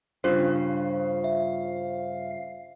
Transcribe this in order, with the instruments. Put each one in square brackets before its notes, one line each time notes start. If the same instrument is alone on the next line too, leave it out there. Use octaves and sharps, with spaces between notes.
[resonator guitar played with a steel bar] G2 C#3 [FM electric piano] F4 C5 [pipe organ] F5
[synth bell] E5